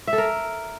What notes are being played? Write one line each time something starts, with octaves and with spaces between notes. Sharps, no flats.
E5
A4
A#4